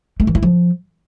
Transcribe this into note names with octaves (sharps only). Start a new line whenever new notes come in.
A3
E3
E4
F3